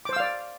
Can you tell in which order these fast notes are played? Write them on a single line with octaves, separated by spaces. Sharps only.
D6 C5 E6 F5 D5